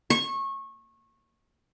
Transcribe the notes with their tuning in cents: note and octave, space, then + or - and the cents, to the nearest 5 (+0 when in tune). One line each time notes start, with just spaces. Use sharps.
C#6 -25